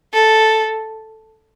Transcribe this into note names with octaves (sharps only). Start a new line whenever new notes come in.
A4